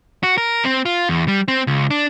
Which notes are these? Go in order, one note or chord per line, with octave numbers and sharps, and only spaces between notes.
F#4
A#4
C4
F4
E2
G3
C4
C#2
D4